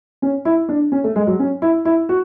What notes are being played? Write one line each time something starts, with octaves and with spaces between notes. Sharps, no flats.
C#4
E4
D4
C#4
A3
G#3
F#3
C#4
E4
E4
F#4